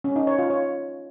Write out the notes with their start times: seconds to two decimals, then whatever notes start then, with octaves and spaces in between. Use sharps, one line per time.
0.04 C#4
0.16 D#4
0.27 C#5
0.39 F4
0.50 C#5